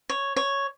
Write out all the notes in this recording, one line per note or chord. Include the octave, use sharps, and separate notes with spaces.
C#5
C#5